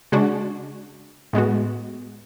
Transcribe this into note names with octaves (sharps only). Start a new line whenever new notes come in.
C#3 G#3 D4 F#4
A2 G#3 B3 F#4